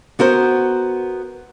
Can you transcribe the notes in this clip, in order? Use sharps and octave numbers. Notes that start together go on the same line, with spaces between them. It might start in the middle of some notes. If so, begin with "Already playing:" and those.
B3 F#4 A#4 C5